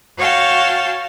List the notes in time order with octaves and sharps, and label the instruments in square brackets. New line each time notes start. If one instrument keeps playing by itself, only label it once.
[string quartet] F#4 C#5 F5 G5 A5